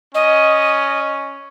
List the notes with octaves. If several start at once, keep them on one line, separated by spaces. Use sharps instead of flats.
C#4 D#5